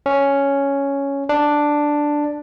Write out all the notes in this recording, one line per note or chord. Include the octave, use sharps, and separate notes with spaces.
C#4
D4